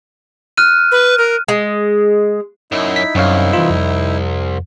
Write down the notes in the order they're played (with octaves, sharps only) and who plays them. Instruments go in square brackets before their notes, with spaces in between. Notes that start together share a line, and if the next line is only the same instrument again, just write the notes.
[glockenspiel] F6 F#6 D#7
[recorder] B4
A#4
[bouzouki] G#3
[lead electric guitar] F#2 [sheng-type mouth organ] D#4 E4
[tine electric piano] B6
[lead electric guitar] C2 [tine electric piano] F#2 C#5 F5
[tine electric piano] E3 F4
F2